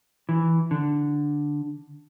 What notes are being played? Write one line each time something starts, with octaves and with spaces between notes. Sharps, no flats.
E3
D3